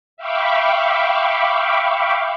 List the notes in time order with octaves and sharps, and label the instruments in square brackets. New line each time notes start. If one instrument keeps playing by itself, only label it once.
[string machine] E5 F5 G5 B5 C#6 D6